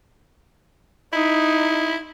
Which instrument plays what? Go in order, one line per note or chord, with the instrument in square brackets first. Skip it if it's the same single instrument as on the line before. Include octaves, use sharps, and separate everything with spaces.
[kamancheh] D#4 [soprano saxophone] E4